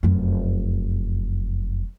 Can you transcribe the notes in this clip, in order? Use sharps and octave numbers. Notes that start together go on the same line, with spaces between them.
F1 F#2